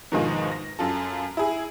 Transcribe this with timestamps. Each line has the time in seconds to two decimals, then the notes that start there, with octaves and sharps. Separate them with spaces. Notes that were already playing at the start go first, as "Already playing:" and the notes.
0.12 G#2 B2 D#3 F3 G#3 A#3
0.52 A#6
0.79 F#2 F4 A4
1.37 E4 G#4